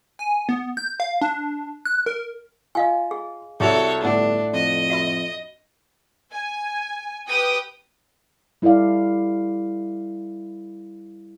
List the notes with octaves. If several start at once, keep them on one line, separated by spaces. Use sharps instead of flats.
G#5
B3
G6
F5
D4
F#6
A#4
F4 D#5 F5 G#5
G#4
C2 F#4 G#4 A4 C#5 E5 F7
G1 A2 D4 F#5
F2 D#5
F#4 E5 B5
G#5
G4 B4 G5 D#6
G3 E4 A4 D5 F5